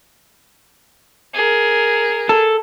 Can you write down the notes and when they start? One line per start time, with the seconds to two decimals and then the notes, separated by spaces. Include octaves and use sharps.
1.34 G#4 A#4
2.29 A4